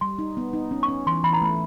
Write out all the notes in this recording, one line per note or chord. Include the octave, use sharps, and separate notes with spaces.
G3 C6
D#4
B3
D#4
C#4
C#6
C#4
E3 C6
E3 B5
A#5
A3 B5